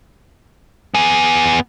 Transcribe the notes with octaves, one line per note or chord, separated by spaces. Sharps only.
B3 G#4